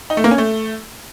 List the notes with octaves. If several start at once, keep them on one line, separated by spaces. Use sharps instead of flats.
D#4
A3
A#3
C#4
A3